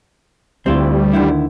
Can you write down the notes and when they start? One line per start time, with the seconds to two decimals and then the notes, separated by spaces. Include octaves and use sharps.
0.66 D2 G3 C4 E4 F4
1.13 D3 D#3 E4